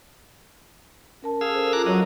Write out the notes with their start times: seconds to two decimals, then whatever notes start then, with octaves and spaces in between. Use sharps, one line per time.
1.23 C#4 A#4 A5
1.41 G#4 F5 E6
1.54 A4 A#4 C5
1.73 F4 G#4 A#5 D6 F#6
1.86 F#3 F#4 D#5